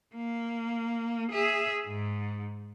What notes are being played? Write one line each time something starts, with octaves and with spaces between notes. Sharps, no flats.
A#3
G#4 E5
G#2